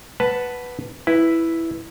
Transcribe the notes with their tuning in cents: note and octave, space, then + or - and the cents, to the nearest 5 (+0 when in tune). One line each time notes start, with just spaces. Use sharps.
B4 +0 F#5 +0 A5 +0
E4 +0 B4 +0